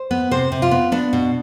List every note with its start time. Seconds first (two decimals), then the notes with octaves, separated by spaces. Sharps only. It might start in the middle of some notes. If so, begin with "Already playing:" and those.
Already playing: C5
0.11 B3
0.31 C3 C5
0.52 C3
0.62 F4
0.71 B3
0.92 B3 D4
1.13 B2